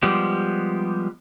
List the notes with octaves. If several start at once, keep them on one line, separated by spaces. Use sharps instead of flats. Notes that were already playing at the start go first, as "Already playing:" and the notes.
F3 G3 G#3 B3 G4